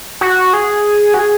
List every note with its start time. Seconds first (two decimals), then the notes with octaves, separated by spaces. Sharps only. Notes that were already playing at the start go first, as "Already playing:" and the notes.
0.21 F#4
0.53 G#4
1.14 F#4
1.19 G#4